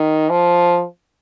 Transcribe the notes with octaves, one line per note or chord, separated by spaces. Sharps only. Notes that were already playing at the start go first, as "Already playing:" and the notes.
Already playing: D#3
F3